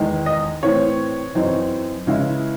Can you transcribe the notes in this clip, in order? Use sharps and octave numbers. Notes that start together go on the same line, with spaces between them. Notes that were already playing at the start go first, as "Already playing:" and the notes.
Already playing: E2 D#3 G#3
D#5
A2 E3 C4 C#5
F#2 E3 C4 D#4
C#3 E3 G#3 C#4 E4